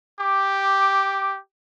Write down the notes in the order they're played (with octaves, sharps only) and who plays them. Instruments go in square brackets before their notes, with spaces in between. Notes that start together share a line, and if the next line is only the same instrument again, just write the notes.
[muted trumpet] G4 [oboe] D6